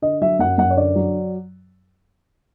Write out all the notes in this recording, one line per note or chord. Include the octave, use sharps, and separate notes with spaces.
D3 D#5
F#3 E5
F#2 F#5
F#2 F#5
C#5
D3 D5
F#3